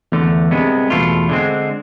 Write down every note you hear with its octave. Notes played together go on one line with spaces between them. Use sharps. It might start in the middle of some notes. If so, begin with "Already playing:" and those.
E2 D3 A3
C2 C3 G#3 B3
E2 B2 A3 D4 F4
D3 G#3 C4